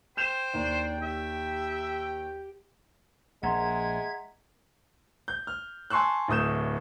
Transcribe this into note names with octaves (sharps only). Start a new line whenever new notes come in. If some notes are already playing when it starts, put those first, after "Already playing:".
C5 G5 G6 E7
D#2 D4
G4 E5
A#1 G#3 E5 F#5 A#5 C6 G#6
G6
F6
G#5 A5 C6 C#6 E6 F#6
D1 A2 D#6 G6 E7